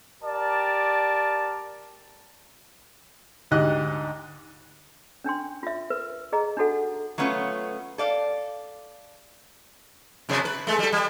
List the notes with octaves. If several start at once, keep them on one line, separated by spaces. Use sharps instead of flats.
G4 A#4 D5 A5
D2 G#2 G4 D#5 F#6
C#4 D4 G5 C6
F4 E5
A#4 B4
G#4 D#5 A#5
D4 D#4 F#4 A4 F#5
F#3 A3 B3 C#4 F4
A4 D5 F5
F#2 C3 B3
B4
G#3 A3
G3 A4
G3